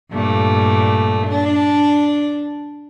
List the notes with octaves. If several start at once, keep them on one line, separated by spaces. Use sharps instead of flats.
G2 A#2 A3
D4